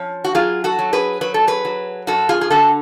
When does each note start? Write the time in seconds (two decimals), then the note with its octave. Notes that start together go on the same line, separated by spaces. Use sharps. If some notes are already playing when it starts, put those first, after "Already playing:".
Already playing: F3 C#4
0.24 F#4
0.35 F#3 F4 G#4
0.64 F#4 A4
0.79 F#3
0.93 G#4 B4
1.21 F#3 B4
1.34 A4
1.47 G#4 B4
1.65 F#3
2.07 F#2 F#4 A4
2.29 F4 G#4
2.41 G#4
2.50 D3 F#4 A4